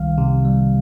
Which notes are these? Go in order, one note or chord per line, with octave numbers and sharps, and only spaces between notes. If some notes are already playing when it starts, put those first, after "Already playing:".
Already playing: C2 D#3 G3 F5
C3
G3